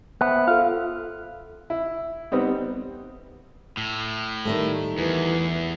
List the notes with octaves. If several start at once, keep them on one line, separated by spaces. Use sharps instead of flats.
B3 C5 E5 F#6
F4 A4 F5
E4
G3 B3 C4 D#4
A2
D#3 G3 A3
E2 E3